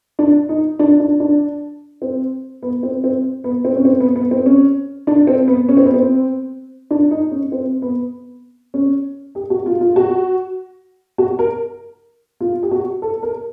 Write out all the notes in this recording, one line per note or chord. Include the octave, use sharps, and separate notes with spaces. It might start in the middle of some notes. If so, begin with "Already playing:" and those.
D4
D#4
D4
D4
D4
C4
B3
C4
C4
B3
C4
C#4
C4
B3
B3
C4
C#4
D4
C4
B3
C#4
C4
B3
C4
D4
D#4
C#4
C4
B3
C#4
G4
F#4
F4
F4
F#4
F#4
A#4
F4
G4
F#4
A4
A#4